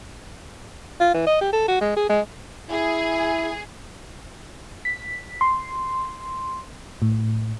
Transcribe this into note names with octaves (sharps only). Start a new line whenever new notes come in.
F4
E3
D#5
G4
A4
F#4
G#3
G#4
G#3
E4 G#4
B6
C6
A2